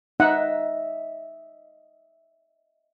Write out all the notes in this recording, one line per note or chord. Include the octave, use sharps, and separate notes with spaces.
D#4 D#5 E5 F#5